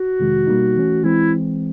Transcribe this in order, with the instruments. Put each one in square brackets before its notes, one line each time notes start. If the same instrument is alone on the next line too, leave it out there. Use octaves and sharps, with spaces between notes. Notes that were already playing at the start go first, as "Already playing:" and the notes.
Already playing: [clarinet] F#4
[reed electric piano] F2 C3 D#3 G#3
B2 G3 A#3 D#4
E3 A3 C#4
[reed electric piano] E3 G#3 C4 [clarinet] E4